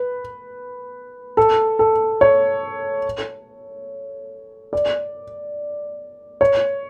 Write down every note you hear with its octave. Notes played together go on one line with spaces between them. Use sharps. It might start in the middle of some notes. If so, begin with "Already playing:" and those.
Already playing: B4
A4
A4
C#5
D5
C#5